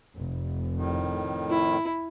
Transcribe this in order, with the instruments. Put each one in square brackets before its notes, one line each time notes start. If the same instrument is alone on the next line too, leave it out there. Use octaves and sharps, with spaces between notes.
[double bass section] F1
[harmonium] F2 A2 D#3
[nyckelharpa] E4